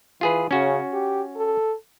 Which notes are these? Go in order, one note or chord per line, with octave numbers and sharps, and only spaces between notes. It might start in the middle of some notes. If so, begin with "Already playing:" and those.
E3 F4 G#4 B4
C#3 C#4 F#4
G4
A4